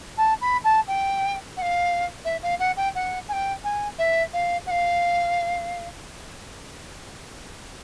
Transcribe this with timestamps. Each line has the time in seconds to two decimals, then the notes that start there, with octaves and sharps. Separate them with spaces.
0.17 A5
0.41 B5
0.64 A5
0.87 G5
1.56 F#5
1.61 F5
2.24 E5
2.42 F5
2.59 F#5
2.76 G5
2.95 F#5
3.28 G#5
3.32 G5
3.64 G#5
3.98 E5
4.33 F5
4.66 F#5
4.70 F5